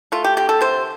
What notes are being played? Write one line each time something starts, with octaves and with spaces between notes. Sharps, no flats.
A3 F4
G4
D3 G4
A4
C3 C5